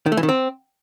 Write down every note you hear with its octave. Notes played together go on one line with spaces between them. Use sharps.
D#3
A3
E3
D#3
C4